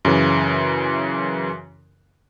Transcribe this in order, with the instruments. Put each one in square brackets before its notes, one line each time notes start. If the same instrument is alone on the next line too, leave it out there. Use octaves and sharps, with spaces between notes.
[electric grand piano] F#2 C#3 E3